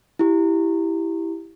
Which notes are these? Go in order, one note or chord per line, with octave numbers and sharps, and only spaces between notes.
E4 G4